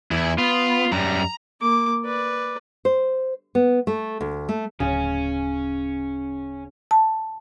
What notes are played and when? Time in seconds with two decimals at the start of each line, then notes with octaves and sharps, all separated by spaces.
0.11 E2 E4
0.38 B3 F4
0.92 F#2 G3 A#5
1.61 A#3 D6
2.04 B4 D5
2.85 C5
3.55 B3
3.87 A3
4.21 D2
4.49 A3
4.80 D1 C#3 C#4
6.91 A5